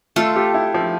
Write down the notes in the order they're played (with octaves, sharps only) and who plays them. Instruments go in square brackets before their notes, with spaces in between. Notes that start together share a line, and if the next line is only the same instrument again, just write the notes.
[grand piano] A3 [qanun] F4 A4
[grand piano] G4
E4
F3